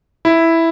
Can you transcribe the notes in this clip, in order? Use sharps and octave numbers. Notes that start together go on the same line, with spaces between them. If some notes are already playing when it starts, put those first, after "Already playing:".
E4